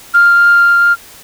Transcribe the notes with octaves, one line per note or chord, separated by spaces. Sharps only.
F6